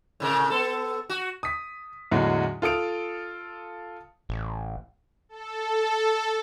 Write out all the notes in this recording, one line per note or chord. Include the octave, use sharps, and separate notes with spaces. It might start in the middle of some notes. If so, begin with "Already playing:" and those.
A2 C3 A#4
B3 A4
F#4
D#6 B6
E2 A2 D3 F#3 G#3
F4 A4 D#6 D7 F7
A1
A4